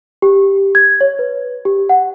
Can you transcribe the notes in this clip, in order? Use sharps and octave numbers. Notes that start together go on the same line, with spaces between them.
G4
G#6
C#5
B4
G4
F#5